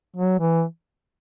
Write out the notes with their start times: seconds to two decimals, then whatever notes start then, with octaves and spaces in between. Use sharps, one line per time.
0.17 F#3
0.39 E3